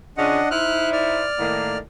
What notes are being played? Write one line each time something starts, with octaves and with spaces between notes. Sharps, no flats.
C#3 C#4 D4 F4 D#5 F#5
D#4 E4 C5 F6 F#6
D5 F6
A2 D#3 A#3